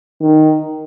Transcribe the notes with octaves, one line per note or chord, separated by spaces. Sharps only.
D#3